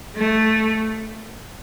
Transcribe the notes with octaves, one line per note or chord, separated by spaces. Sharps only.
A3